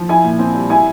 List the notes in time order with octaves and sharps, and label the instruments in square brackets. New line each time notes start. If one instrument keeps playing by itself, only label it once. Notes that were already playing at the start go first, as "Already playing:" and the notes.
Already playing: [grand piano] F3
[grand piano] E4 [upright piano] G#5
[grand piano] A#2
C4
G3
[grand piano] E4 [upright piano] G#5